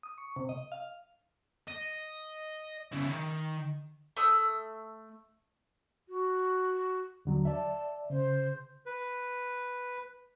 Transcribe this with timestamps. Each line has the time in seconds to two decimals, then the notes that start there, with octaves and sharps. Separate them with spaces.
0.03 D#6
0.18 C#6
0.36 C3
0.49 D#5
0.72 F5
1.68 D#5
2.92 C#3 E4
3.08 D#3
4.17 A3 D#6 E6
6.09 F#4
7.25 D#2 D3 F#3
7.45 D5 E5 A5
8.10 C#3 C5
8.86 B4